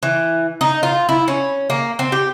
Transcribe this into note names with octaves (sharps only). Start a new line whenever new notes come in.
E3
D#4
F4
E4
C#4
A#3
C4
G4